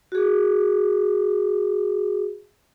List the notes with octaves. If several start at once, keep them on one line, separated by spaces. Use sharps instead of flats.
F#4 G#4